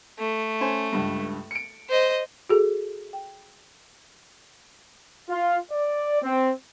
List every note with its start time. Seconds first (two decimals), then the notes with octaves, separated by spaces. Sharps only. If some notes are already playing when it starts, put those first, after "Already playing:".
0.19 A3
0.61 C#4 C5 G#5
0.92 C#2 G2
1.51 C#7 D7
1.89 C5 D#5
2.50 F#4 G#4 A4
3.13 G5
5.29 F4
5.71 D5
6.22 C4